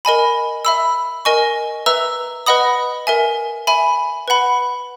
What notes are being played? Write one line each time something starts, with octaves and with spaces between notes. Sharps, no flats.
A#4 D#5 G#5 B5
E5 B5 E6
A#4 D#5 G#5 C#6
B4 E5 A#5 E6
B4 D#5 F#5 B5 D#6
A#4 E5 G#5
E5 G#5 B5
B4 F#5 B5